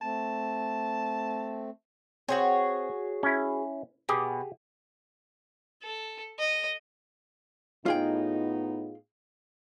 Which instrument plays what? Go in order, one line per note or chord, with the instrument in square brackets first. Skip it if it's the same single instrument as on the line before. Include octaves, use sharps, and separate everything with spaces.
[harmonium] A3 C4 [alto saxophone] A5
[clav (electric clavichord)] C4 [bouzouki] F#4 G#4 C#5
[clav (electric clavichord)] C#4 E4
[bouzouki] B2 [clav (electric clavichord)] G4 G#4
[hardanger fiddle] A4
D#5
[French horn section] A2 B3 D#4 [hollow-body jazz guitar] F4 G#4 G5